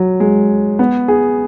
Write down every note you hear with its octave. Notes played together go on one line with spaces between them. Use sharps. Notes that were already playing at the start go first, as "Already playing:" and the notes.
Already playing: F#3
G#3
B3
G#4